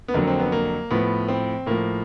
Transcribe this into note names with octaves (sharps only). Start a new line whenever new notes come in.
B3
F2 D3 F#3 A#3
C4
B3
A#3
A2 F3 B3
C4
A2 F3 A#3